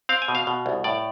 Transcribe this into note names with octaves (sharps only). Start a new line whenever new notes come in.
C4 F5
G#5
B2
F5
B2
C2
A2 D5